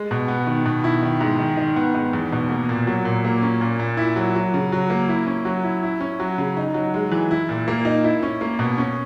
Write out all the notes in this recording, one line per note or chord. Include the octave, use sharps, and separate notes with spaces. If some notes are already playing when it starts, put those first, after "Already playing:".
Already playing: G#3
B2
B3
D#3
B2
E4
D#3
G#2
D#3
D#3
B3
G#2
E2
B2
A#3
A#2
F#3
A#2
A#3
C#4
A#2
A#2
E4
F#3
F#3
C#3
F#3
A#3
E4
C#4
F#3
E4
E4
C#4
F#3
C#3
D#4
F#3
G#3
E3
E4
A#2
A#3
D#4
E4
C#4
A#3
B2
C#4